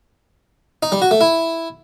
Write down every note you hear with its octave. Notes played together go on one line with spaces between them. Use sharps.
D#4
G3
F#4
A3
E4